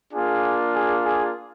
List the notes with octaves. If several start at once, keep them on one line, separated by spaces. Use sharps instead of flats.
A#3 D4 F4 G#4
G#4
G#4